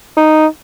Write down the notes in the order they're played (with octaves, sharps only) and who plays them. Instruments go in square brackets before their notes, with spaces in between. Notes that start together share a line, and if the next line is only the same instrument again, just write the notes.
[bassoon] D#4